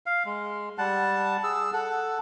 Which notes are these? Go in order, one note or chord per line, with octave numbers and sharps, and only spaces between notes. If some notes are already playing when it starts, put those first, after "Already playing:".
F5
G#3
G3 F#5 A5
G#4 E6
A4 F#5